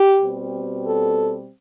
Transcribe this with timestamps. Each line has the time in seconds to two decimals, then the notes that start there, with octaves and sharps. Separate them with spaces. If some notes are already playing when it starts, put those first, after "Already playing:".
Already playing: G4
0.20 B2 G3 C4
0.86 A4